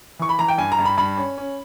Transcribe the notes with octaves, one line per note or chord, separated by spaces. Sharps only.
E3 C#6
B5
E3 A#5
G5
G2 G#5
A#5
G2
B5
G2 B5
C#4
C#4